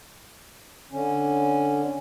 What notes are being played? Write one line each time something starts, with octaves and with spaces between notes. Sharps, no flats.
D3 C#4